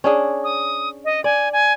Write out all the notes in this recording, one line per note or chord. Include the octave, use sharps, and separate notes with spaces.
C#4 D4 G#4
D#6
D#5
D5 G#5
G#5